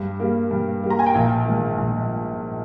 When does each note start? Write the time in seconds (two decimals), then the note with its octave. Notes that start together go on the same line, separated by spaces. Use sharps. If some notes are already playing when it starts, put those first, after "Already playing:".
Already playing: G2
0.20 G3 A#3
0.51 G2
0.83 G3 A#3
0.90 A#5
0.99 G#5
1.06 G5
1.14 A#1 F5
1.46 G#2 D#3
1.78 A#1